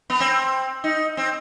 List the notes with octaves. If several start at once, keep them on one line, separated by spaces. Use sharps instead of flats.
B3
C4
D#4
C4